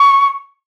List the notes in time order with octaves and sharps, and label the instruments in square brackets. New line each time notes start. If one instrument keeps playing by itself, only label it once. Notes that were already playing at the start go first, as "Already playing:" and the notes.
Already playing: [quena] C#6